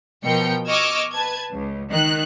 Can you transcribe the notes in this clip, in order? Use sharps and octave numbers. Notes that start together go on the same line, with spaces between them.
B2 F3 A#4 G5 C#7
D#5 C#6 D6 E6 F6 G#6
B4 A5 G#6
C#2
D#3 F#6